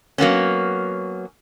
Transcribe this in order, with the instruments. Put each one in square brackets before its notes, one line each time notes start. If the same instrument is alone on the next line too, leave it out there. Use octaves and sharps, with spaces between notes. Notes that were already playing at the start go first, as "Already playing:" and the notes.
[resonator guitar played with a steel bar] F#3 A#3 B3 C#4